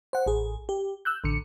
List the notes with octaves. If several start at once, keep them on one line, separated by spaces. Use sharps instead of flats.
C5 F#5
A1 G#4
G4
E6 F#6 G6
A1 D3 C#7